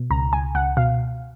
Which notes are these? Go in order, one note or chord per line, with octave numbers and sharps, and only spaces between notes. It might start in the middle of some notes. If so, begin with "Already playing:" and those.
Already playing: B2
C#2 A#5
C#2 G#5
C#2 F#5
B2 F5